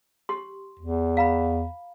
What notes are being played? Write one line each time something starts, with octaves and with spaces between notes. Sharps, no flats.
G4 C6
E2
F5 A#5 B5